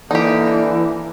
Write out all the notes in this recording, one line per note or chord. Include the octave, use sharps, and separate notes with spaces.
D3 E3 A#3 D#4 G4